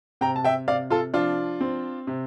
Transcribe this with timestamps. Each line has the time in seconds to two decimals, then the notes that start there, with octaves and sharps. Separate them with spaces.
0.21 C3 G5 A#5
0.36 A5
0.45 E5 G5
0.68 C3 D5 F5
0.90 F4 A4
1.14 F3 D4 F4
1.61 C4
2.07 C3